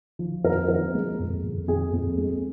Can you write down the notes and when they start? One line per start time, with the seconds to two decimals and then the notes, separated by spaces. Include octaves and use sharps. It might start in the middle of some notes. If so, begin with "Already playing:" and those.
0.19 F3
0.44 F2 A#4
0.68 F3 A#4
0.94 G#3
1.19 F2
1.44 F2
1.68 F2 G#4
1.93 F2
2.18 G#3